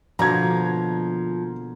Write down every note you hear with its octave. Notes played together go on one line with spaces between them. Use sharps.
B2 D3 F3 A#3 A#5 G#6